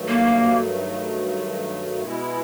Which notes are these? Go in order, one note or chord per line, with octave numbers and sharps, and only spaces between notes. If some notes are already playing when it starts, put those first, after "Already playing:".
Already playing: G2 D#3 F#3 A3
A#3
B2 G#3 B3 E4